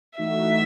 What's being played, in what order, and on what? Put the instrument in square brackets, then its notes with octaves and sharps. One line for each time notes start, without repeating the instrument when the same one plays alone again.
[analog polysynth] E3 A3 D#4 F#4 [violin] E5